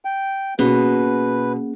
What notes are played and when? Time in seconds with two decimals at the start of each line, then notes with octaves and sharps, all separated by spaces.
0.05 G5
0.59 B2 A#3 C#4 G#4 B4